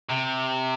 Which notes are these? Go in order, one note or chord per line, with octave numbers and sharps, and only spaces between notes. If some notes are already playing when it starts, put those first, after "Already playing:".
C3